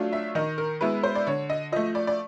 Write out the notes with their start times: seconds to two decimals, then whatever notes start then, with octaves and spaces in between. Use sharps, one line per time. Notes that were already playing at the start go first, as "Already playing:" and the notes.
Already playing: F#3 A3 D4 F4
0.13 E5
0.35 D#3 D#5
0.58 A#4
0.81 G#3 B3 E4 B4
1.03 C5
1.15 D5
1.27 D3 C#5
1.50 D#5
1.72 F3 A3 D#5
1.95 D5
2.07 D5